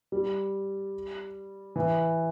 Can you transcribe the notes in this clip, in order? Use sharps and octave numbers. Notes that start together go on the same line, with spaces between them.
G3
E3